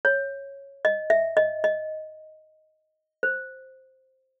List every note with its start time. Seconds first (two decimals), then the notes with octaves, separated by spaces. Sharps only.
0.05 C#5
0.85 D#5
1.10 E5
1.37 D#5
1.64 D#5
3.23 C5